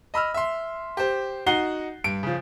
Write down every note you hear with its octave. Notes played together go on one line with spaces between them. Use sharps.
D#5 B5 E6 F6
E5 C6
G4 C5
D#4 F#4 F#5 F#6 C7 G7
G2 D7
C#3 F3